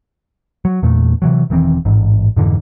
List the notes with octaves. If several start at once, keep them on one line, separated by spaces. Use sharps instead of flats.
F#3
E2 A#2 A3
C3 E3 F#3
E1 D#3 E3 C4
A1 G#2
F2 G#2 D3 E3